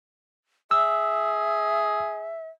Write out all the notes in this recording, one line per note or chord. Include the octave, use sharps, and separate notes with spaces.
G#4 E5 E6